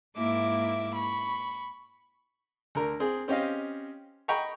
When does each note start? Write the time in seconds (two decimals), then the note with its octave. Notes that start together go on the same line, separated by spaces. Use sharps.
0.16 G#2 A#3 E4 E5 D6
0.93 B5 C#6
2.75 D2 A#4
3.00 C4 G#4
3.28 C4 C#4 G4 D#5 F5
4.28 D#5 G5 A#5 B5 C#6